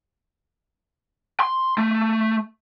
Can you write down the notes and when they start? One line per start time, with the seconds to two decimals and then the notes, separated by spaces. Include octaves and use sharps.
1.40 C6
1.78 A3